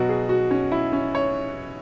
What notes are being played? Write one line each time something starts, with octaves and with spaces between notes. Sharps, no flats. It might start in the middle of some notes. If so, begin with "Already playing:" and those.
Already playing: B2 F#3 F#4
G#4
F#4
C#4
E4
C#4
C#5